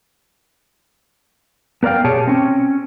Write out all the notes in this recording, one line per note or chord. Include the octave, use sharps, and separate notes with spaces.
B3 A#4 D5 F5 G5
B2 G4 G#4 C#5 A5
C4 C#4